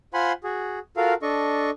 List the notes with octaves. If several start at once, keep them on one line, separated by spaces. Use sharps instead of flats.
F4 C5 F#5 G#5 B5 C6
F#4 G#4
F4 F#4 A4 A#4 F5
D4 A4 D#5 C#6